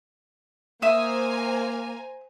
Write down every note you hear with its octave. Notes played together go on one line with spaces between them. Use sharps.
A#3 C5 E5 G#5 A#5 D#6